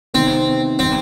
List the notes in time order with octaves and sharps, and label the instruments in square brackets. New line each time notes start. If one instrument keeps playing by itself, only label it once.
[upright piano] C3 D#3 B3 [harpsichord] C4
[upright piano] D#3 G3 [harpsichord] C4